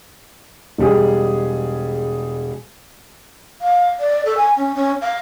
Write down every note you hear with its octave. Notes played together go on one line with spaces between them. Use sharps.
E1 G3 G#4
F5
D5
A4
G#5
C#4
C#4
F5